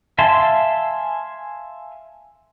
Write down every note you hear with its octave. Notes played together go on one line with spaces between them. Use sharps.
E5 F5 G#5 A5 C6